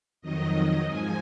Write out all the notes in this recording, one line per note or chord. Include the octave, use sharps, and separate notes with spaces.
F2 D#3 F#3 D#5
G#2 F3 G#5